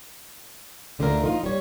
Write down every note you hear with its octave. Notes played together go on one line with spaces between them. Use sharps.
D2 D3 A3 D4 F4 A#4
F3 D#4 F4
G3 C#5